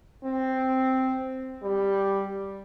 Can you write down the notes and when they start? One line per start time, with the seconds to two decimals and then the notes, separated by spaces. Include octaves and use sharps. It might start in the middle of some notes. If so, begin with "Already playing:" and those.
0.24 C4
1.62 G3